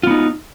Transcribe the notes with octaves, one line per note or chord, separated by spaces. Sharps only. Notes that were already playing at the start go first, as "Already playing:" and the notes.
B3 D#4 F4